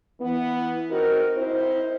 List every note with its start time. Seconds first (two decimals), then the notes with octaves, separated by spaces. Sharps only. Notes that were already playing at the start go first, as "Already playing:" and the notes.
0.19 E3 B3
0.90 C4 D#4 F#4 A#4
1.36 C4 D#4 E4 C5